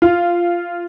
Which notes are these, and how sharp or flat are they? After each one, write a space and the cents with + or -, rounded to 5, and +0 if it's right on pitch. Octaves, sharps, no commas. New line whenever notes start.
F4 -5